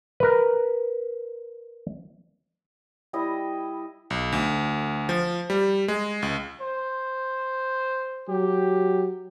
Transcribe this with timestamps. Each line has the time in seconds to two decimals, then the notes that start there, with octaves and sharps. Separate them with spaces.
0.20 A#4 B4
3.13 G3 E4 D#5 D#6
4.10 B1
4.32 D2
5.09 F3
5.50 G3
5.88 G#3
6.22 C#2
6.61 C5
8.29 F#3 G4